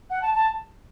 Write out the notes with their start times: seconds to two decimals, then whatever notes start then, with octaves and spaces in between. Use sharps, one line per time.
0.10 F#5
0.22 A5
0.34 A5